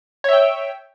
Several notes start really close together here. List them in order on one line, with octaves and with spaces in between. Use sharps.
C#5 E5 G5